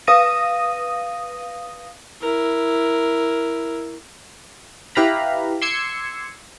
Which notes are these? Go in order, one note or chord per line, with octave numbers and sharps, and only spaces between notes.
B4 F5 D#6 A#6 D#7
E4 A#4
E4 G4 B4 F5 A#5 B5
C6 D6 E6 G#6 C7 C#7